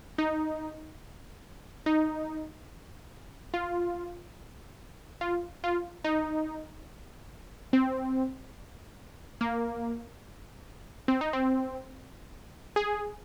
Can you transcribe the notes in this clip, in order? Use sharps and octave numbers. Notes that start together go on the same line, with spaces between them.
D#4
D#4
F4
F4
F4
D#4
C4
A#3
C4
D#4
C4
G#4